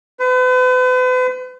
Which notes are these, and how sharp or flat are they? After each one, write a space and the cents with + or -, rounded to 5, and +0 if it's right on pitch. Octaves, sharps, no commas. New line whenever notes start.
B4 +40